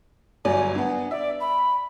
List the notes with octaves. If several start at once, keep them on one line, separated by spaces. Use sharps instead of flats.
G1 F#3 D5 G#5
B3 D4
D5 E5
B5